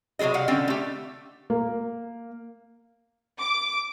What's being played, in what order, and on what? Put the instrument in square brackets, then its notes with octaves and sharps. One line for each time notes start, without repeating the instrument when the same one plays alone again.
[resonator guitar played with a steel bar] C3 F#3 G#3 G#4 D#5
G3 F5 F#5
D3 G3 C4 C#4 D5
A3 G4
[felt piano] A#3
[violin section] D6